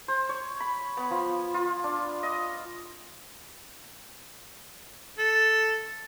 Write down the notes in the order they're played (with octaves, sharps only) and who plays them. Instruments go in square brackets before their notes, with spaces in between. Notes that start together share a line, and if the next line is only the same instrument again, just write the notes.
[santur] C5
C#5
B5
B3
F3
F4
D4
D#5
[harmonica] A4